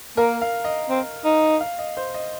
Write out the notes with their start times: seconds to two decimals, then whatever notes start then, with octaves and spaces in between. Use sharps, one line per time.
0.17 A#3 A#4
0.42 F5
0.64 D#5
0.89 C4
1.25 D#4
1.61 F5
1.79 D#5
1.97 C5
2.14 D#5